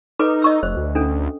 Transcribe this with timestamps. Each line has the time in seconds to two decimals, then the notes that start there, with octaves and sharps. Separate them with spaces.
0.19 D#4 A4 B4 D6
0.42 D#5 C#6 E6
0.63 F1 C5
0.77 D2
0.95 C#4 D4 A4